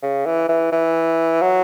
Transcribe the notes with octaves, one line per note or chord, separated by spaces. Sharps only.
C#3
E3
E3
E3
F#3